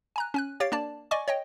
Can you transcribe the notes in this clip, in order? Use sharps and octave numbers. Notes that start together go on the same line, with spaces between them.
G#5 A#5 F#6
C#4 G#5 F#6
G4 C#5 F5 A6 C7 D7
A#3 D4 D5 A5
D5 D#5 G#5 C#6 D6
C#5 D#5 G5